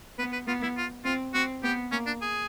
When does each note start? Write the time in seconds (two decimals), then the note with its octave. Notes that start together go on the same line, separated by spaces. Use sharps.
0.19 B3 B4
0.33 B4
0.47 B3 F4
0.63 E4
0.77 F4
1.05 C4 F4
1.34 C4 F#4
1.63 B3 G4
1.92 A#3 C#4
2.06 D4
2.21 G#4